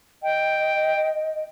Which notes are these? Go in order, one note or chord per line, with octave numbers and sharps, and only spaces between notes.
D#5 G5